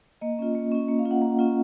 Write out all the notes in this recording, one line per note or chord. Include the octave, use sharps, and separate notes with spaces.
A#3 D#5
C#4 F4
A#3
C#4 F4
A#3
F5
C#4 F4
F#5
A#3
C#4 F4